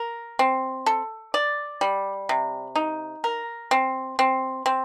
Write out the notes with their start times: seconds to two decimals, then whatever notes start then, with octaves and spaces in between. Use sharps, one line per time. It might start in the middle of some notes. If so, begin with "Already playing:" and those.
Already playing: A#4
0.39 C4
0.86 A4
1.34 D5
1.81 G3
2.29 C3
2.76 D#4
3.24 A#4
3.71 C4
4.19 C4
4.66 C4